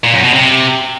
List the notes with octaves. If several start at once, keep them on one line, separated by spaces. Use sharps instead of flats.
A#2
F#2
B2
C3